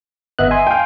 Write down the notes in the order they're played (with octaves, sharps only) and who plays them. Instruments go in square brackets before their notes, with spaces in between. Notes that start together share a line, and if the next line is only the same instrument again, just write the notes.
[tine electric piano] G1 B3 F#6 [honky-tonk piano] D#5 E5
[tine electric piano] G#5 C6
[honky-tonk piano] F5 G5